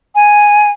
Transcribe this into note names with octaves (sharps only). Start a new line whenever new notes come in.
G#5